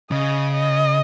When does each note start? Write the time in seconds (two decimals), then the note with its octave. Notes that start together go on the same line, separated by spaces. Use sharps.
0.11 C#3 D#5
0.54 D#5